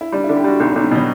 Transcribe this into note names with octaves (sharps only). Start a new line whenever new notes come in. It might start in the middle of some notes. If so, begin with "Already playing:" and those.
E4
G3 D4
D3 E4
G4
G3 F#4
B1 F#4
B1 C#4
G3
B2 F#3